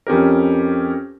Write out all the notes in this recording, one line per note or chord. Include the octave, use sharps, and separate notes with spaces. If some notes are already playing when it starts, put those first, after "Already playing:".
F2 C#4 G4 A#4